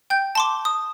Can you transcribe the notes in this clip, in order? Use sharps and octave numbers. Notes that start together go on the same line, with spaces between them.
G5 G6
A5 C6 D6
D#6